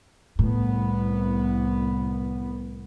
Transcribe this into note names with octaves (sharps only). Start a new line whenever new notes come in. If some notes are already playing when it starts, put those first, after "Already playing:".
C2 A2 B3